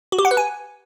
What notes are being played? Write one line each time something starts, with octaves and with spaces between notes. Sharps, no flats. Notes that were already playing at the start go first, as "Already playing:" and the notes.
F#4
G4
F#5
B4
G#5